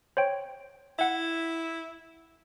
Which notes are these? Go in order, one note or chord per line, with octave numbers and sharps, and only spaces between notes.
C5 C#5 G5
E4 E5 F#5